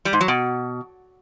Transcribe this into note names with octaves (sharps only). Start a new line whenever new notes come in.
G3
G#2
F#3
B2